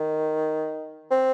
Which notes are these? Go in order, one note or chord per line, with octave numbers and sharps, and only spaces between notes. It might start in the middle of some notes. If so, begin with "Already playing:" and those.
Already playing: D#3
C4